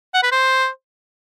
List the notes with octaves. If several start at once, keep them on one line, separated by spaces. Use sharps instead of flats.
F#5
B4
C5